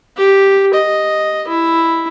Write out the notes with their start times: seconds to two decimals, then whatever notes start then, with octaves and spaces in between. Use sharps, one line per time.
0.17 G4
0.74 D#5
1.48 E4